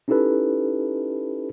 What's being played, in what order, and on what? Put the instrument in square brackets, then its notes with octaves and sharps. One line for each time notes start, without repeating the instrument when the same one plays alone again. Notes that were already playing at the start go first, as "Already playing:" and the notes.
[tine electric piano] C#4 D#4 E4 G4 A4 B4